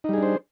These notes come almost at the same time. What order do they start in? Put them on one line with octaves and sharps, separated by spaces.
D#4 G3 G#4 D4 C5